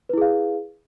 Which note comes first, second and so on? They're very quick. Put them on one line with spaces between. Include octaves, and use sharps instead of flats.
B4 E4 G#4 F5